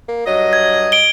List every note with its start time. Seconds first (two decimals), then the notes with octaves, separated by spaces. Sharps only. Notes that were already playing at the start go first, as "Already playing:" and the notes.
0.08 A#3
0.26 G2 F#3 D#5
0.53 G#6
0.92 D7 G7